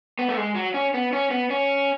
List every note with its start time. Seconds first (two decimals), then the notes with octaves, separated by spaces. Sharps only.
0.19 B3
0.29 A3
0.37 G#3
0.55 F#3
0.74 C#4
0.94 B3
1.13 C#4
1.31 B3
1.50 C#4